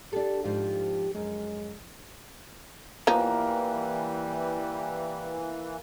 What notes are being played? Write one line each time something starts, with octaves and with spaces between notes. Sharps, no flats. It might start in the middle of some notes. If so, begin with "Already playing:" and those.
D4 G4 A4
G#2 F3 G4
F#2 G#3
E3 F3 G3 A#3 B3 D#4